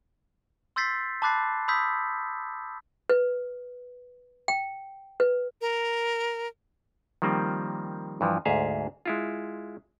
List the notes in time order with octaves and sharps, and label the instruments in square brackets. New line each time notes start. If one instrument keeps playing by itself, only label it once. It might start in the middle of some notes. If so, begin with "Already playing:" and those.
[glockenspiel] C6 E6 G6 A6 B6 C7
A5 B5 D6 F#6 A6 C7
B5 C6 D#6 E6 G6 B6
[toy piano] B4
G5
B4
[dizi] A#4
[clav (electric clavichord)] D#3 F3 G3 A#3 C4
G2 E3 F3
D2 G#2 G#4 E5 F5
G#3 E4 F4